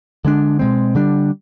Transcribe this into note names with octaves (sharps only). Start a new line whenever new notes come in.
D3 G#3 D4
B2 G#3 C4
D3 G3 D4